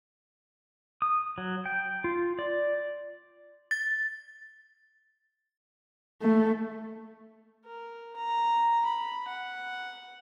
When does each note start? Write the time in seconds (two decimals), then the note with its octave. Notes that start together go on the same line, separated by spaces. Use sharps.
1.02 D#6
1.38 F#3
1.66 G5
2.04 F4
2.39 D5
3.71 A6
6.22 A3
7.65 A#4
8.16 A#5
8.85 B5
9.28 F#5